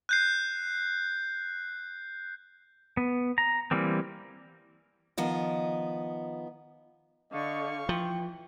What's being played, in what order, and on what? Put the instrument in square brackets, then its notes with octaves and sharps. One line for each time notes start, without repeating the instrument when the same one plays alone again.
[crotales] F#6 G6 C7
[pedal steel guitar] B3
A#5
E3 G3 A#3 C4
[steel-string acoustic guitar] D#3 F3 B3 D#5
[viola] D3 [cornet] D#5 [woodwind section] F5 C#6
[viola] E3 [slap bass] F3 [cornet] G5